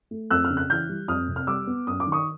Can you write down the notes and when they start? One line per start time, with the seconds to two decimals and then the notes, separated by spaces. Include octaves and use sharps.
0.11 A3
0.30 F2 E6 F#6
0.45 F6
0.50 C#3
0.57 F#6
0.70 E3 F6 G6
0.89 G3
1.08 F2 D#6 F6
1.28 C3
1.36 F6
1.47 G3 D6 E6
1.67 B3
1.87 F#2 D#6
2.00 D6
2.07 D#3
2.12 C#6 D#6